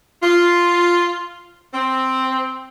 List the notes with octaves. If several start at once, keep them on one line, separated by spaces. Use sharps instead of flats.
F4
C4